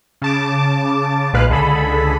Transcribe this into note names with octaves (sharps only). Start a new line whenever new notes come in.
C#3 A5 D6
B1 A#2 G#3 B4 F5 F#6
C#2 D3 G#4 A4 B5